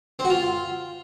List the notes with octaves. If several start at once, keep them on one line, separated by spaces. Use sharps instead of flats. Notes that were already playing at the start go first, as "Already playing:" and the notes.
C4
F#4
F4